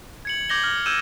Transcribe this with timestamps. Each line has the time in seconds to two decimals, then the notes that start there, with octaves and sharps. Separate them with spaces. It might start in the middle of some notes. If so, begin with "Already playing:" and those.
0.25 G#6 C#7 F#7
0.49 D6 G6 G#6 A#6 F#7 G7
0.63 F6
0.86 E6 G6 G#6 D#7 E7 G7